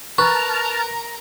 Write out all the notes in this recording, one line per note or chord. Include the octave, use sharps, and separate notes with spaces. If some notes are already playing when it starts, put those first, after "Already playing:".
A#4 B4 A5 A#5 C#6 F6